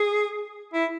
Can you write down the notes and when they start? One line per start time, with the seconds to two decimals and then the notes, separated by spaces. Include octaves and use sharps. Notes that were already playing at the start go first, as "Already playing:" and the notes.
Already playing: G#4
0.74 E4